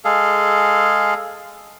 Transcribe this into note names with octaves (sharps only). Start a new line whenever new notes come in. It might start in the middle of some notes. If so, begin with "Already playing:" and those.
G#3 G#4 A4 F5